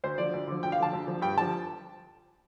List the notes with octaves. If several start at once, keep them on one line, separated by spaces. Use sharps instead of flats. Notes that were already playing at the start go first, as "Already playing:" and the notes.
D2 C5
D3 F3 D5
D2
D3 F3
D2 G5
F5
D3 F3 A5
D2
D3 F3
G2 G5
D3 F3 A5